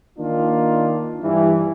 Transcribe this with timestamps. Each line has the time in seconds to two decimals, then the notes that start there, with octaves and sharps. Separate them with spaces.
0.18 D#3 A#3 D4 F4
1.21 G2 E3